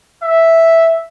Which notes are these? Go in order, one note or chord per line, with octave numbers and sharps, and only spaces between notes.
E5